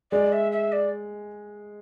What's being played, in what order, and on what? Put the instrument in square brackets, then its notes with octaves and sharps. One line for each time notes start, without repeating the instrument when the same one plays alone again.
[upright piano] G#3 [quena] D5
[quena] E5
E5
D5